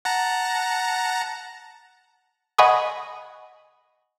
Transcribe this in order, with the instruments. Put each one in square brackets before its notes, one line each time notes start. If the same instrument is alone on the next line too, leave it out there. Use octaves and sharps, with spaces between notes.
[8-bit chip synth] F#5 A5 A#5
[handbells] D#5 F#5 G#5 B5 C#6 D#6